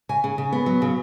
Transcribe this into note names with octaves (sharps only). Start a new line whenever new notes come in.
C#3 G#5
C#3
C#3
B3
F#3
C#3